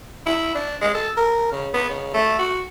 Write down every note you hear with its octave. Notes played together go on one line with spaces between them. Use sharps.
E4
D4
G#3
A4
A#4
C#3
B3
C#3
A3
F#4